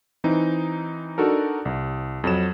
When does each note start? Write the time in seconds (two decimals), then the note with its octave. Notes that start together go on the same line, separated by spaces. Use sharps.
0.24 E3 C4 D#4
1.18 D4 D#4 F#4 A4 A#4
1.65 C2
2.24 F2 F#3 E7